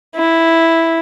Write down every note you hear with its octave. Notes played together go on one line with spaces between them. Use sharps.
E4